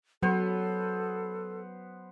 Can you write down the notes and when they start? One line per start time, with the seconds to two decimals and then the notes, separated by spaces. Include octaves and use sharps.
0.23 F#3 B3 A4 C5